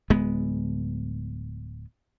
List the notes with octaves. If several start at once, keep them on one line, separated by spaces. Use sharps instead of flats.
D1 G#3 B3